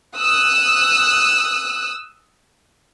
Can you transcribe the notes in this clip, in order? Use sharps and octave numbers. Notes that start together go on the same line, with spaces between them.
D#6 E6 F#6